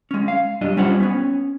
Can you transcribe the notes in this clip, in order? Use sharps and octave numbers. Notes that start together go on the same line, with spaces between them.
G#3 C#4
F5
F#2 G3 D4 D#5
G3 C#4 F4 C5 F#5
B3 C#4